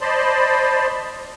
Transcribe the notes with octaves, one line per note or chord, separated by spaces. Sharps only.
C5 D5 D#5 A5 B5 C6